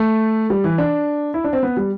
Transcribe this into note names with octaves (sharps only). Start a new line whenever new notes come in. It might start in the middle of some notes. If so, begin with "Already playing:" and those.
Already playing: A3
G3
E3
D4
E4
D4
C4
B3
G3